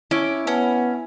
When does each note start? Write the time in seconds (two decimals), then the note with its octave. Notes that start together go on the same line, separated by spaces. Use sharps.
0.11 C#4 E4 D6
0.47 B3 C#4